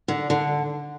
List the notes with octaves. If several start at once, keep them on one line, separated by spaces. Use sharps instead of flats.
D3
D3